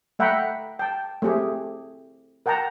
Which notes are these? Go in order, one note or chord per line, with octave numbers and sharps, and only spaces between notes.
A3 E5 F#5 G5 A#5 B5
G5 A5
A3 C4 G4 G#4
A#4 F#5 G5 A5 A#5